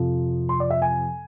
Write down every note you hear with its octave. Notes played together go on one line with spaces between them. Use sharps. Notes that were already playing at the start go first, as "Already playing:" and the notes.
Already playing: F2 C3 F3
C6
D5
E5
G#5